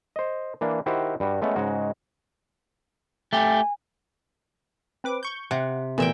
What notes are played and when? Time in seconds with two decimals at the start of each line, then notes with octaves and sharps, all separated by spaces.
0.16 C5 D#5
0.61 E3 A#3 D4
0.86 D#3 E4 F#4 G4 C5
1.20 G2 G3 F#4
1.42 G#3 A3 B3 C#4
1.56 G#2 C#3 G#3 F#4
3.33 A3 G4 G#5
5.04 C4 B4 D6
5.23 C#6 G6
5.51 C3 F#5
5.98 A#2 E3 A3 B3 E5 G5